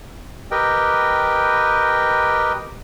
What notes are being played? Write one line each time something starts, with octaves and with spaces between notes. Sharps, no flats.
G4 A#4 B4 D#5 G5